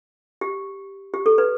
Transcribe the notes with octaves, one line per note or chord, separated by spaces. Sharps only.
G4
G4
A4
B4